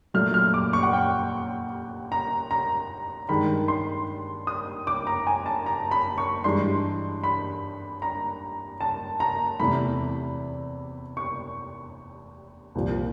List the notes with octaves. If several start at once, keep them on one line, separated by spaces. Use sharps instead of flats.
A#2 F#3 A3 F6
F6
D6
C#6
F#5
G5
A#5
A#5
G2 D#3 G#3 B5
C6
D#6
D6
A#5
G#5
A5
A#5
B5
C#6
G2 E3 G#3 C6
B5
A#5
A5
A#5
E2 C3 E3 A3 B5
C#6
C2 A#2 F3